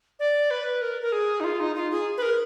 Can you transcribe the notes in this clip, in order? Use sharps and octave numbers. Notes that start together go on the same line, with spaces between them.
D5
B4
A#4
A#4
G#4
D#4
F4
D#4
F4
G#4
B4
A#4